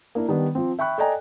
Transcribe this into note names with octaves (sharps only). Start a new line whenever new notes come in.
A#3 D4 E4
D#3 G3 B3 D4
F3 C4
E5 G5 B5 C#6 F#6
A4 D5 D#5 G5 G#5 A#5